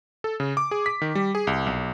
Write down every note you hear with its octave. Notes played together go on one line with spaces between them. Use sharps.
A4
C#3
D6
G#4
B6
D#3
G3
G#4
C2
B1